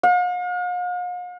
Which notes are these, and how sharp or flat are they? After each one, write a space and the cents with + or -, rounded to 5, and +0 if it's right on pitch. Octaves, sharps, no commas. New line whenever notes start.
F5 +45